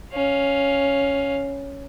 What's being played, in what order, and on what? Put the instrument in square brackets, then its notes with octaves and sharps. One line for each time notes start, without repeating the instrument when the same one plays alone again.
[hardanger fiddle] C#4 F5